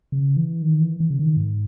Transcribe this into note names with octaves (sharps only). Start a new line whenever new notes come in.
C#3
E3
D#3
E3
E3
C#3
D#3
G#2